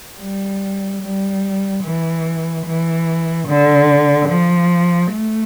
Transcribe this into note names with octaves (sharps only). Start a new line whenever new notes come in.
G3
G3
E3
E3
D3
F3
A3